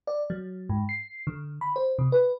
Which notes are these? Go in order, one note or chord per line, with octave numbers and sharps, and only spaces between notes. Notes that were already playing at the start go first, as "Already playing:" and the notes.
D5
F#3
G#2
C7
D3
B5
C5
C3
B4